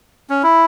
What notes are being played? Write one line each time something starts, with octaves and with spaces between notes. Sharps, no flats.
C#4
E4